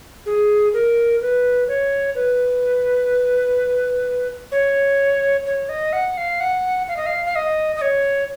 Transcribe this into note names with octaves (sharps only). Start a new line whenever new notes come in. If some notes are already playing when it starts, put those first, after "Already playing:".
G#4
A#4
B4
C#5
B4
C#5
C#5
D#5
F#5
F5
F#5
F5
D#5
F5
F5
D#5
D#5
C#5